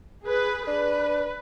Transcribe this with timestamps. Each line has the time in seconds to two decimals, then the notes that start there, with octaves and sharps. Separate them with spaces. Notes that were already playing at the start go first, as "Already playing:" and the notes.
0.24 G#4 B4
0.67 D4 B4